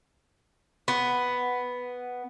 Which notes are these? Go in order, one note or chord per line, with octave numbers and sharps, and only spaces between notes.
B3